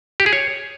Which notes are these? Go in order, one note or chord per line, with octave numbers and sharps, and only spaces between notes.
G4
G#4
C#5